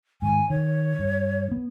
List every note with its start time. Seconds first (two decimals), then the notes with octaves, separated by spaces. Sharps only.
0.22 G#2 D#3 G#5
0.50 D#3 C#5
0.99 G2
1.51 B3